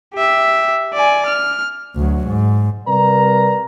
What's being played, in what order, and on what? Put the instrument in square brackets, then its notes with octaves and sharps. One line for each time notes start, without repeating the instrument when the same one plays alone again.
[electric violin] G4 E5
D5 G#5
F6
[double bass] D2 F#3
G#2
[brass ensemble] C3 G3 A#4 B4 D5 A#5